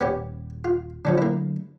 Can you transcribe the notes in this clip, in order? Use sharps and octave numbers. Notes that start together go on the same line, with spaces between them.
D#1 B3 C#4 G4
F4
D3 F3 F#3 A3 C#4 D4
A#3 E4